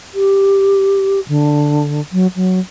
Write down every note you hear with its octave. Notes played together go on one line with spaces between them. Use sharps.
G4
D3
F#3
F#3